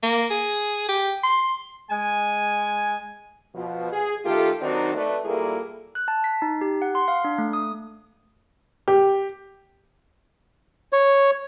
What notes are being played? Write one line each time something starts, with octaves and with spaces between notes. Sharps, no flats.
A#3
G#4
G4
C6
G#3 G#5
B2 F3
G#4
D#3 A3 F4 G4 A4
D#3 F#3 C4 D4 D#4 F#4
A3 B4 D5
A#2 G3 A#3 E4 G#4 A4
F#6
A5
B6
D#4
G4
F#5
C6
F5
D4
A3
D#6
G4
C#5